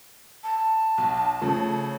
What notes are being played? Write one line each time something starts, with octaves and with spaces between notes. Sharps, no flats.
A5
B1
C#3 F3 A3